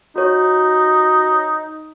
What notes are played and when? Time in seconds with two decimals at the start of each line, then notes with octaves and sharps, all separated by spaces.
0.16 D#4 F#4 C#5